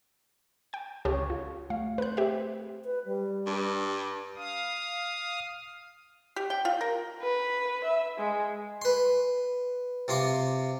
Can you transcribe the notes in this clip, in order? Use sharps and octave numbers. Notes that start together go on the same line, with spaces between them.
G5 G6
C#2 G4 A4 C#5
F4
A3 F5
B4 C5 F#6
G4 E5
B4
G3
G2
F5 D#6
G4
G5
F4
A#4
B4
E5
G#3
B4 C6
C3 F4 C6 D6